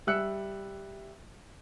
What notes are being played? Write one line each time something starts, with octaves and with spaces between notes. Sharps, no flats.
G3 E5 E6 F#6 C#7